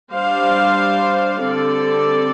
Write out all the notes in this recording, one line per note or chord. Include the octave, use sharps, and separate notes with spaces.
G3 D4 C5 F5
D3 G3 C4 A4 D5